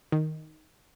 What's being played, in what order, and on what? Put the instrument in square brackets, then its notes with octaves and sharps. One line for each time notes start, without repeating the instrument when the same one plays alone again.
[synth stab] D#3